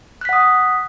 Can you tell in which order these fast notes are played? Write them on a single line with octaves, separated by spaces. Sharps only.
F#6 B6 F#5 D#6